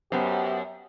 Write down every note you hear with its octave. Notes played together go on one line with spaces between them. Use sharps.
F#2 B3 G4 C5